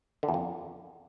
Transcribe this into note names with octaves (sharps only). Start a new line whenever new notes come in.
D3
E2
F2